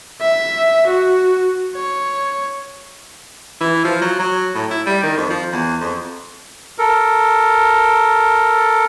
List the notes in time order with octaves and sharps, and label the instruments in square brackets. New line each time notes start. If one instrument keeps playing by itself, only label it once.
[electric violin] E5
F#4
C#5
[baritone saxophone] E3
F3
F#3
F#3
A2
E4
G3
D#3
F2
F3
E2
F2
[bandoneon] A4 A#4